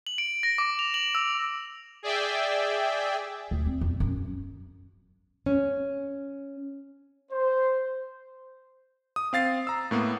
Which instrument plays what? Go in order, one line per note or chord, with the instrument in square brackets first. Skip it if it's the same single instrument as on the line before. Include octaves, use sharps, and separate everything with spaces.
[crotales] F#7
D7
A#6
D6
F7
F#7
E6
[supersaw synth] G#4 D5 E5 G5
[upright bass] D2
C4
E2
F#2
[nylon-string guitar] C#4
[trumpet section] C5
[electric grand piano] D#6
C4 F5 A6 C7
A#5 E6
A2 A#3 B3